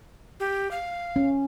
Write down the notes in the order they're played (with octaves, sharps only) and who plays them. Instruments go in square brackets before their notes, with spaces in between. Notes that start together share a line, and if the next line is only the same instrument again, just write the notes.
[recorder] G4
F5
[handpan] C#4